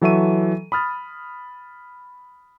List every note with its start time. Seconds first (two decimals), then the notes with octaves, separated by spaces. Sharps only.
0.02 E3 F#3 A4 E5 C#6 D#7
0.72 B5 D#6 F6 A6